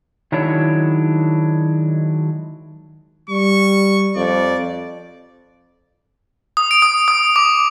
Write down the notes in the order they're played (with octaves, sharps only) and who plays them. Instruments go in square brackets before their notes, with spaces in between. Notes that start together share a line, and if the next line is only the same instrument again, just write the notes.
[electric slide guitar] D#3 F#3 G#3 D4 E4 C#5
[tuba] G3 [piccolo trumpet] C#6
[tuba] F2 [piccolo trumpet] D5
[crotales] D#6
D7
D#6
D#6
D6